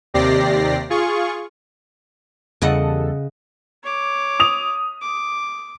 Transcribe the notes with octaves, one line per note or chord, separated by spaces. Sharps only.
D#2 C3 G4 D5 A#6 C7
F4 G#4 C#6
E2 C#3 G3 A4 D#5 F#5
C#5 D6
D#6 F7
D6